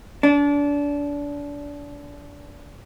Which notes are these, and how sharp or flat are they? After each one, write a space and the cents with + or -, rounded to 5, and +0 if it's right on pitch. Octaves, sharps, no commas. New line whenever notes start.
D4 -30